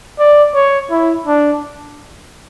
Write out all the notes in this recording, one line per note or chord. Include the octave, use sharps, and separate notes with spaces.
D5
C#5
E4
D4